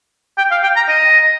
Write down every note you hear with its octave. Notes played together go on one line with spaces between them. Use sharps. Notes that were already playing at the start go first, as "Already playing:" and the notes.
G5
F5
G5
A#5
D#5